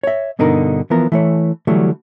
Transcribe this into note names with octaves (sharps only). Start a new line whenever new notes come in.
C#5 E5
G2 B2 D3 D#4 A#4
E3 F3 B3 A#4
E3 A3 C#5
D3 E3 F#3 G3 A3